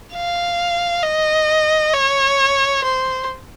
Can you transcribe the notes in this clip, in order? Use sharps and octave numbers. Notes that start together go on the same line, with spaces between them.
F5
D#5
C#5
C5